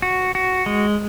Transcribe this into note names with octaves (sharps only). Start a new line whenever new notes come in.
F#4
F#4
G#3